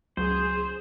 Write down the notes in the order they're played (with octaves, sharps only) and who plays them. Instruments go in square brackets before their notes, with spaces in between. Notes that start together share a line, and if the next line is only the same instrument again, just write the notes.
[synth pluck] C#2 F#3 [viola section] G#4 [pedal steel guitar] C5